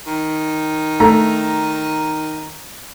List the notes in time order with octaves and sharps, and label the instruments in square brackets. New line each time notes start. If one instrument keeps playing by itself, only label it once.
[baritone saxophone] D#3
[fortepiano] A3 [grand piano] A#5